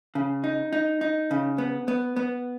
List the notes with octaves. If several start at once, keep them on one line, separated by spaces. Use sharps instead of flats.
C#3
D#4
D#4
D#4
C#3
B3
B3
B3